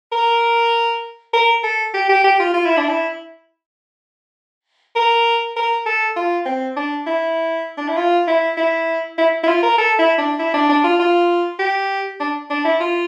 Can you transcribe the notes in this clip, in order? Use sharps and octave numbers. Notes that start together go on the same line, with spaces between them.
A#4
A#4
A4
G4
G4
G4
F4
F4
E4
D4
E4
A#4
A#4
A4
F4
C4
D4
E4
D4
E4
F4
E4
E4
E4
E4
F4
A#4
A4
E4
D4
E4
D4
D4
F4
F4
G4
D4
D4
E4
F4